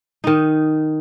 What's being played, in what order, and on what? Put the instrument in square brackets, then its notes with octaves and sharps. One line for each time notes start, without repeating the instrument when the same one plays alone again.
[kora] D#3 D#4